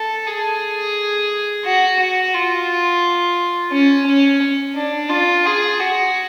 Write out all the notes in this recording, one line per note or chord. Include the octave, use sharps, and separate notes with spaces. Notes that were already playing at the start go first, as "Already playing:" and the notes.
Already playing: A4
G#4
F#4
F#4
F4
C#4
C#4
D4
F4
G#4
F#4